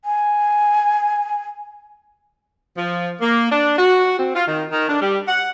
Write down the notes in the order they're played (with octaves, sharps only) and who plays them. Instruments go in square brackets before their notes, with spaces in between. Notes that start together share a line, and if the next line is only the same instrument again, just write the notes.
[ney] G#5
[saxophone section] F3
A#3
D4
F#4
C4
F4
D#3
D#3
D4
G3
F#5